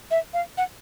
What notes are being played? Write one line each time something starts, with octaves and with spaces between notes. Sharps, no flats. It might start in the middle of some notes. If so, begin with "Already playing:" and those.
E5
F5
F#5